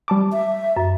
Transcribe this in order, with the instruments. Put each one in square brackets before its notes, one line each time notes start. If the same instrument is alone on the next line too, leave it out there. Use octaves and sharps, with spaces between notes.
[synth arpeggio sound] G3 A5 D6
[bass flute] E5
[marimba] F#2